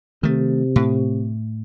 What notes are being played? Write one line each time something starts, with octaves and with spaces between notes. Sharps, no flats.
C3 D#3 A3
A2